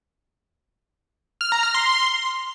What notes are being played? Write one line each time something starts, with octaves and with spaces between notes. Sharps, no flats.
F6
A#5
F6
C6